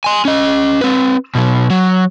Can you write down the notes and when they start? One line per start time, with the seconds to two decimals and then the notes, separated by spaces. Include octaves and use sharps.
0.04 G#5 C6
0.25 C#4 D#5
0.81 C4 B4
1.35 B2 F#3
1.70 F#3